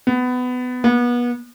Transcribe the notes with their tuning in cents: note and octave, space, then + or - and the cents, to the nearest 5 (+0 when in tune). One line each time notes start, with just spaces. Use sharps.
B3 +20
B3 -30